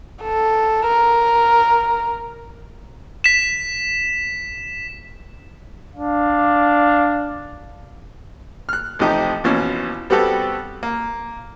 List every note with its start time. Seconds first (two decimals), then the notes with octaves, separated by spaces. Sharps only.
0.23 A4
0.86 A#4
3.24 B6 E7
5.95 D4 F5
8.69 F6 F#6
8.99 A1 C3 F3 D#4 G4
9.44 A#1 B2 E3 C#4
10.10 G3 B3 C4 F#4 G4 A4
10.83 A#3